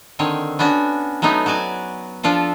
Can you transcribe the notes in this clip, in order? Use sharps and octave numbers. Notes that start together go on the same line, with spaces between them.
D3 D#3 C4 C#5
B3 C#4 D4 F#4
F#3 A3 B3 D#4
F#3 F#4 D5 G#5
F3 D4 F4 A4